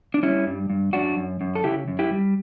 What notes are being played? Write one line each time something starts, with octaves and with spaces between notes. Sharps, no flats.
D4
G3 C#4 E4
G2
G2
F#2 D4 F#4
F#2
F#2
A4
C#3 E4 G4
F#2
E4 G4
G3